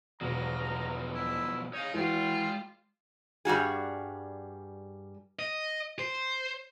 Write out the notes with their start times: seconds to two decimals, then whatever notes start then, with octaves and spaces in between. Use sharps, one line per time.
0.21 E1 B2 F3 F#3 A#5
1.14 E4
1.73 D#4 C#5 F5
1.94 E3 G#3 F4 F#4 G5
3.45 G2 G3 F#4 G#4
5.39 D#5
5.99 C5